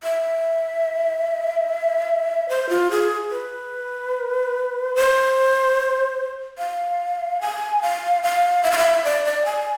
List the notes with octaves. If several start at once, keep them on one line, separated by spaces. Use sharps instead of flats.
E5
C5
F4
G#4
B4
C5
F5
G#5
F5
F5
E5
F5
E5
D5
D5
G#5